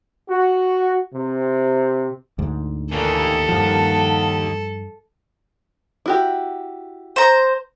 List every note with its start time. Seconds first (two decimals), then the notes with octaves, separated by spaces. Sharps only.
0.29 F#4
1.15 C3
2.39 D2 G#2
2.92 D#2 A#2 D#3 E3 A4
3.48 G2 F3 F5 F#5 A5
6.06 E4 F#4 G4
7.16 C5 A#5